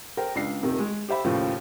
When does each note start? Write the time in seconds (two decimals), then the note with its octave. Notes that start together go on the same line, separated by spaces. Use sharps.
0.17 A#4 C5 G5
0.35 C#2 D4 C7
0.63 D#1 C3 D#3
0.80 G#3
1.08 G4 C5 E5 B5
1.24 D#2 A2 C#3 F3 F5 G5